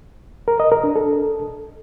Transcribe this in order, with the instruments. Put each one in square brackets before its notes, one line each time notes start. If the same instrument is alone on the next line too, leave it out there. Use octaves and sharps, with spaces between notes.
[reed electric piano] A#4
D#5
A#4
D4
A4